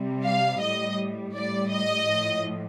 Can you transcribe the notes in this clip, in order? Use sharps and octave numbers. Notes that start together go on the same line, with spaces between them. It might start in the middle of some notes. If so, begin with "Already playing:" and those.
Already playing: C3 G3
F5
A2 G3 D#5
A2 G3 D5
D#5
A2 F3